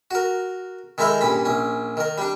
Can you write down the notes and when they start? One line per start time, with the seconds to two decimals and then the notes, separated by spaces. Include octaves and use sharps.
0.11 F#4 A#4
0.98 D#3 G#3 D#4 E4 A4 A#4
1.21 G2 A#2 C#4 B5
1.45 A#1 C#4
1.97 D#3 A#4
2.18 G3 D4